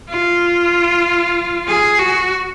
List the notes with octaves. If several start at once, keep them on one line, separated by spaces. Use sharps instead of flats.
F4
G#4
F#4